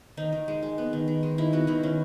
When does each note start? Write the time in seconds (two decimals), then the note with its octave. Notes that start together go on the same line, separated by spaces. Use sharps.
0.17 D#3 D#4
0.32 D#3
0.48 G#3
0.63 G#3
0.78 B3
0.93 D#3
1.08 D#3
1.23 G#3
1.38 D#3 E4
1.53 B3 F#4
1.67 D#3 E4
1.83 D#3 C#4